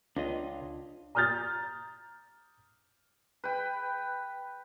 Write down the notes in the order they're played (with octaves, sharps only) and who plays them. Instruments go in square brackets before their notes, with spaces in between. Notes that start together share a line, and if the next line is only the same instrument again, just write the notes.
[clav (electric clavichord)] C#2 [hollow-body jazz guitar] D4 F4 D#5
[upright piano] A#5 D#6 F6 G6 A6
[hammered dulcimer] B4 G5